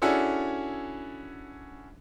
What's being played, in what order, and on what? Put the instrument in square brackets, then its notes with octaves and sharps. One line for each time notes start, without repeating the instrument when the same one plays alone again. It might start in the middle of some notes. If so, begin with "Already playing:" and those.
[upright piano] C#4 D4 E4 F#4 G#4 A4